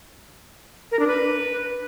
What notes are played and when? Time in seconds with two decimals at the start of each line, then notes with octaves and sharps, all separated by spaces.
0.92 A#4
0.99 D4
1.07 B4